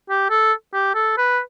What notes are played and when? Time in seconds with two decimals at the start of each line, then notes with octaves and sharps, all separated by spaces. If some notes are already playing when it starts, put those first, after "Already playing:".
0.09 G4
0.30 A4
0.73 G4
0.95 A4
1.17 B4